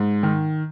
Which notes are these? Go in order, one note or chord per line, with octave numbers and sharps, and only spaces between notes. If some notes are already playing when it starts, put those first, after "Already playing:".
Already playing: G#2
D#3